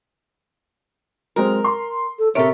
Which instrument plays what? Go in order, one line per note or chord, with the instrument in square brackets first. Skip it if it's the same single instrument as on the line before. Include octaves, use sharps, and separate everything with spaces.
[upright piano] F#3 G#3 C4 [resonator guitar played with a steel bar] A#4
[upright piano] C6
[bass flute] A4
[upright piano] C3 A#4 D7 [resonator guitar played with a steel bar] A4 C#5 [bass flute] E5